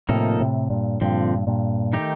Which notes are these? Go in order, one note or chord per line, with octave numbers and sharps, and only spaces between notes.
A2 C3 F3 A#3 D#4 A4
A2 C3
G2 A#2
G2 A#2 D3 F3 C4
G2 A#2
D#3 A3 D#4 G4